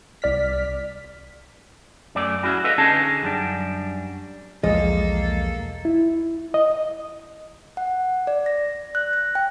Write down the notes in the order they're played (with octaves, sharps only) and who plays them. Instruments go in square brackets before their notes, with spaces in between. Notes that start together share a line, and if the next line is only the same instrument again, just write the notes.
[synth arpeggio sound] C2 D5 F6 B6
[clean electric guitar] F#2 A3 D5
C#4 E4 F#4 G#4
A4 B4 D#5 F5
D3 C#4 D#4 G#4 A5
F#2 G3 D4
[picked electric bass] B1 E2 F3 [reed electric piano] G#3 [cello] A#3 A4 [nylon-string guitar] D#5
[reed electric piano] E4
D#5
[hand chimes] F#5
D5
A#6
F#6
A#6
G5